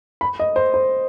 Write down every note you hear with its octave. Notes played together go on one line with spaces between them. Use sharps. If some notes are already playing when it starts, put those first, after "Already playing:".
B5
D#5
C5
C5